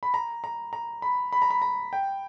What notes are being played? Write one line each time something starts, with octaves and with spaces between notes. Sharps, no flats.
B5
A#5
A#5
A#5
B5
B5
A#5
B5
A#5
G5